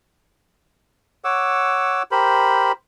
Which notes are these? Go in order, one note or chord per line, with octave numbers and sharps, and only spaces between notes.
C#5 F#5 D6 E6
G4 A#4 C5 B5